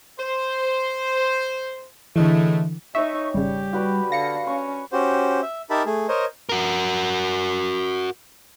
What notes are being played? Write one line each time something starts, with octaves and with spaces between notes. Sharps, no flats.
C5
A2 D3 E3 G#3 A3
D#4 C#5 E5 G#5 C#6
G#1 C#3 G3 G4
F#4 B4 D5
D3 F5 A#6 C#7
C#4 C#6
C#4 F#4 G4 C5
E5
D#4 G4 A#4 E5 A5 B5
A3 G#4
A#4 C5 C#5 D#5
F#4 A#4